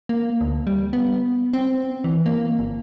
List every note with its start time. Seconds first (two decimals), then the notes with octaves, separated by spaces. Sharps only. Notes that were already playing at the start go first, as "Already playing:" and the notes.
0.09 A#3
0.41 D2
0.67 G3
0.93 B3
1.53 C4
2.04 E3
2.26 A#3
2.59 G1